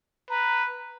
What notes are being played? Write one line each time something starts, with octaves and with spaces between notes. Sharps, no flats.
B4 A#5